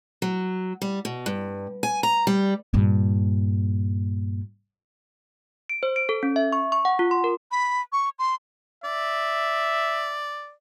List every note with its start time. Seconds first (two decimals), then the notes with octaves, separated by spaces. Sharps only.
0.22 F#3
0.82 G3
1.05 B2
1.26 G2
1.83 G#5
2.03 A#5
2.27 G3
2.73 G2 A#2
5.69 D7
5.83 C5
5.96 D7
6.09 A4
6.23 C#4
6.36 E5
6.53 C#6
6.72 C#6
6.85 F#5
6.99 F4
7.11 C6
7.24 A#4
7.51 B5
7.92 C#6
8.19 C6
8.84 D5 E5